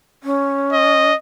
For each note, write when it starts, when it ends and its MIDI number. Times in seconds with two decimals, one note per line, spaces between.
0.23 1.12 61
0.73 1.15 75